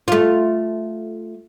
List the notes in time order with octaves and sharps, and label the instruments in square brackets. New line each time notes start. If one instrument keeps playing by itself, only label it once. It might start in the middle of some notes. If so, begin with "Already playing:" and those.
[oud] A3 F4